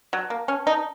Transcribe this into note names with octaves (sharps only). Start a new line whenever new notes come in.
F#3
A#3
C#4
D#4